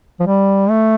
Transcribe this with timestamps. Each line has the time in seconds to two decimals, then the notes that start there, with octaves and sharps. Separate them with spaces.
0.20 F3
0.27 G3
0.70 A3